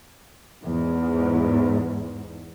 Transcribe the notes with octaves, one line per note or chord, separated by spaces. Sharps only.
E2 G#2